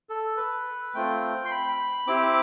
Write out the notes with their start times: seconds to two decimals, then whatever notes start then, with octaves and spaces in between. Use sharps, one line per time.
0.09 A4
0.37 B4
0.95 A3 C4 F4 G5
1.45 C6
1.51 B5
2.07 C4 E4 G4 D6